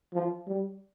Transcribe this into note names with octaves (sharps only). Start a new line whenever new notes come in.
F3
G3